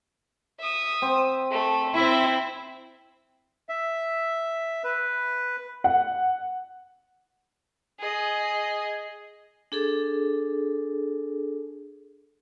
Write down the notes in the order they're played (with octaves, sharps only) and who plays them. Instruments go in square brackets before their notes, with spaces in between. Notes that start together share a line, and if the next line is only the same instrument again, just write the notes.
[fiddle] E5 D#6
[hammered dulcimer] C4
[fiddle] A3
[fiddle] C4 E5 [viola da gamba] E4
[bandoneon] E5
B4
[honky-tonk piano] F#5
[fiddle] G#4 D#5
[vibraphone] D4 G#4 A4